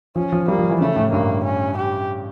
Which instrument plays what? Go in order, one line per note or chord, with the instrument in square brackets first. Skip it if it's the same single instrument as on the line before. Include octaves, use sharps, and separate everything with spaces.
[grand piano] F3 [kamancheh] C#4
[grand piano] F3
[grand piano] G3 [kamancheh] A#3
[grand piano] F3
E3
[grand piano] C#3 [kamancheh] A3
[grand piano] A2
[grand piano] G2 [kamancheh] A#3
[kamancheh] C#4
G4